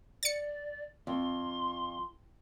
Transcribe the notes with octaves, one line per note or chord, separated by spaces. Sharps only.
D5 A6 C#7
F2 C6